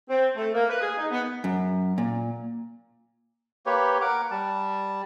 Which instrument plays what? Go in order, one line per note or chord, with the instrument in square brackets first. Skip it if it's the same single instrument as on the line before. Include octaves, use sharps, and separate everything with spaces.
[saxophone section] C4
A3
A#3
B4
G#4
D#4
B3
[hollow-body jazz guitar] F#2
A#2
[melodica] A#3 G4 B4 C#5
A#4 F#5 D6
G3 A5